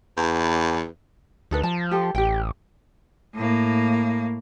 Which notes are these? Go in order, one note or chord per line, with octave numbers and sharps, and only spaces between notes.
E2
D2 D#4 A4 B4
F3 A5
G4 A4
A1 G4 G5
A2 A#3